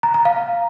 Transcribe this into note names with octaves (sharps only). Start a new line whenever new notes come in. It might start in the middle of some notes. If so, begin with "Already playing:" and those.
A#5
A#5
F5